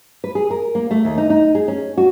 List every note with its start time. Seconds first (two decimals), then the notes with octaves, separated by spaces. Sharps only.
0.24 B4
0.35 G#4
0.50 A#4
0.75 A#3
0.91 A3
1.05 D#2
1.18 D#4
1.30 D#4
1.55 G#4
1.68 C#4
1.97 F#4